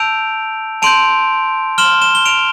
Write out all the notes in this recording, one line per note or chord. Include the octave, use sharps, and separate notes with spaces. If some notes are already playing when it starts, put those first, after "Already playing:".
Already playing: A5 E6 G6 D7 F7
A5 C6 G6 D7 F7
C6 F6 E7 G7
E7 G7
G7
D7 F7